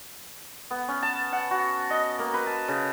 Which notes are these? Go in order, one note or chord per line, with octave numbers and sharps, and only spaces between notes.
B3
C#4
A5
F#5
F#4
D#5
A#3
B4
A5
C#3